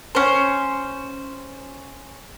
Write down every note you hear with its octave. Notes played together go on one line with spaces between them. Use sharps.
C#4 C5